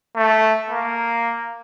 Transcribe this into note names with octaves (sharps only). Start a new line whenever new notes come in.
A3
A#3